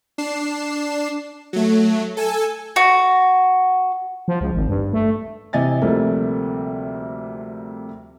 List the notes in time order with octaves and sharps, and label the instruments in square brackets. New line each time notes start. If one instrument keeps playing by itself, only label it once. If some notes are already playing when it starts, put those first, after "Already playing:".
[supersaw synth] D4 C7 E7
F#3 A3
A4 G#5 E6
[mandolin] F#4
[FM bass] F3
C#2
G#1
G2
A3
[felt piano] C3 E3 D#5 G#5 A6
D2 C3 F3 G3 A3 A#3